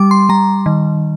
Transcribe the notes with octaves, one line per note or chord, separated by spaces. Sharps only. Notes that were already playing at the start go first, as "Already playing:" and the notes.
Already playing: G3 D6
C6
G3 A#5
D#3